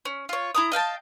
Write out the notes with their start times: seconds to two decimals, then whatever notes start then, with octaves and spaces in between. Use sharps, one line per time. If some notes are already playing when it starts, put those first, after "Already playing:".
0.05 C#4
0.29 F4 C#5
0.55 E4 A#5 D#6
0.72 D#5 F5 G5 A5